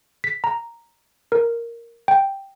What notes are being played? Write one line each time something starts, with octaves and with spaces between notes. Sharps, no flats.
B6
A#5
A#4
G5